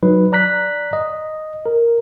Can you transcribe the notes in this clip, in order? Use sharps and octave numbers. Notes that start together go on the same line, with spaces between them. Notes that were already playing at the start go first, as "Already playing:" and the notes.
F#3 D#4 B4
D5 A#5 F#6 B6
D#5
A#4